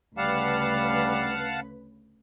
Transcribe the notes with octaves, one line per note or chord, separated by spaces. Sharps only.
D2 C#3 G3 B4 F5 F#5 A5